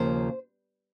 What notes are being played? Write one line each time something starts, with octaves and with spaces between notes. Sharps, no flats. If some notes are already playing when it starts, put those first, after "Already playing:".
Already playing: D#2 C#3 F3 A#3 C5